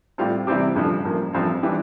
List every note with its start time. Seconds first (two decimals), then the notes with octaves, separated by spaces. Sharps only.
0.18 A2 G3 C4 F4
0.47 C3 E3 G3 C4 G4
0.76 A1 G2 D3 F3
1.05 A1 G2 F3 A#3
1.33 A1 G2 F3 C4 F4
1.63 E3 G3 D4